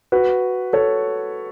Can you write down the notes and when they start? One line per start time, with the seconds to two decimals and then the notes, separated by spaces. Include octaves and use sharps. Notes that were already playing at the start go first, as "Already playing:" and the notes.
0.12 F#4 B4
0.73 A4 C#5